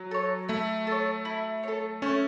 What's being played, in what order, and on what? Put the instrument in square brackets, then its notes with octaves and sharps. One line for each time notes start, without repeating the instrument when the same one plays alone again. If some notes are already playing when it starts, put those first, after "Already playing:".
Already playing: [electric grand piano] F#3
[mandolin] A4 C#5
[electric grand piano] A3 [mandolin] E4
[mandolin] A4 C#5
E4
A4 C#5
[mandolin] A3 [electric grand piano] C#4